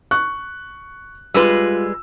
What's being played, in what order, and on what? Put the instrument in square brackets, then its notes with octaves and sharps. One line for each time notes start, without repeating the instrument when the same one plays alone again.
[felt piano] C#6 F#6
[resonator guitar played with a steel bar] G3 G#3 B4 [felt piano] F4 E6